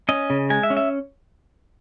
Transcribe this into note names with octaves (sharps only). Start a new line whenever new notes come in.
C#4 D#5
C#3
G#3 G#5
E5
C#4
E5